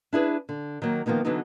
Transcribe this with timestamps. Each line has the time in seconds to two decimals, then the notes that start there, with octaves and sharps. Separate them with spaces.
0.13 D4 E4 G#4 B4
0.49 D3
0.82 D#3 F#3 A#3
1.06 D#3 F3 A#3 B3 D#4
1.25 D3 E3 F#3 B3 D#4